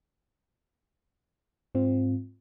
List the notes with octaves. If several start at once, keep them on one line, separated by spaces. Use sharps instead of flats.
G#2 C4 F4